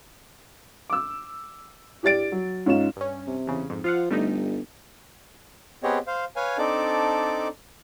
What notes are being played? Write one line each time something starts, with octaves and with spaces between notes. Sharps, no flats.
D6 E6
E4 G4 D5 A6 D7
F#3
G#2 C#4 D#4 F4 E7
G2 C#4
C3
E2 C#3
F2 G#2
F3 F4 F5 F#5
G1 G3 A3 D#4
B3 C4 G4 G#4 C#5 D#5
C5 F5
B4 C#5 F5 G#5
C4 D4 D#4 A4 D5 D6